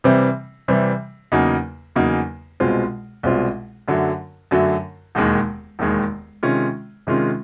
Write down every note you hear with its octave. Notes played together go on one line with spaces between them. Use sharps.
C3 E3 G3 C4
C3 E3 G3 C4
E2 C#3 F#3 A#3 D#4
E2 C#3 F#3 A#3 D#4
C2 B2 G#3 C4 F4
C2 B2 G#3 C4 F4
F#2 D3 F#3 A3
F#2 D3 F#3 A3
E1 D#2 D#3 G#3
E1 D#2 D#3 G#3
C3 D#3 G#3 C#4 F4
C3 D#3 G#3 C#4 F4